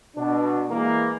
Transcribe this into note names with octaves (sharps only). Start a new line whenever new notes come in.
B2 D4
E3 G#3 A#3